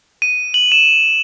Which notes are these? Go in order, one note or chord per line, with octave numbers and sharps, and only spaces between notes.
D#7
F#7
E7